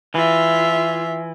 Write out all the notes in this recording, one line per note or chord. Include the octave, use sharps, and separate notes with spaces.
E3 F4 E5